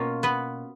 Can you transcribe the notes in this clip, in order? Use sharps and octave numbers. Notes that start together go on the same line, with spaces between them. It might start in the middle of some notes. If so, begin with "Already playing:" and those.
Already playing: B2 A#3 C#4 F4 C#5
B3 B4